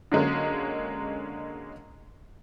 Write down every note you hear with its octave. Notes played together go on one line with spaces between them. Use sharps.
D3 F#3 G#3 A#3 C#4